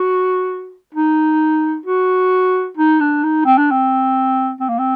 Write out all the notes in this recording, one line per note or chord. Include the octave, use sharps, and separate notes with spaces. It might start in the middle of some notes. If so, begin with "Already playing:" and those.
Already playing: F#4
D#4
F#4
D#4
D4
D#4
C4
D4
C4
C4
A#3
C4